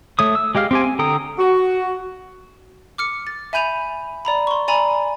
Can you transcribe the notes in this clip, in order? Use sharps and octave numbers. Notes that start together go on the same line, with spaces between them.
A3 C#5 D#6
E6
G#3 G4 D#5 F5 F6
C4 G4 G#5
G#5
D3 A4 G5 A#5 D#6
F#4
D6 F6 C#7
A6
E5 G#5 B5 G6 D#7 F7
D5 A#5 B5
C6 C#6
D5 G#5 A#5 B5